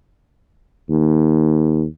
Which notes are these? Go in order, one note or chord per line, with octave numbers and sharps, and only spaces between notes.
D#2